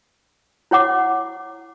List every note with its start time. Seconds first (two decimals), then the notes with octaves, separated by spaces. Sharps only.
0.71 E4 C#5 F#5 D6